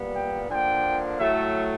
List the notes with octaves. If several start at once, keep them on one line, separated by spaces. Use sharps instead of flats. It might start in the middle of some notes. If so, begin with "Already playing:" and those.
Already playing: A#2 G3 B3
G5
D3 F3 A#3 G5
A2 F#3 A3 E5